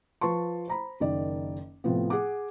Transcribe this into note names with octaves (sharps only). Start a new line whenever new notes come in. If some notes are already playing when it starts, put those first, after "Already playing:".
F3 B4 A5 C6 C#6
C5 A#5 B5
F#1 D#3 D5
A2 C3 F3 B3
G#4 F#5 D6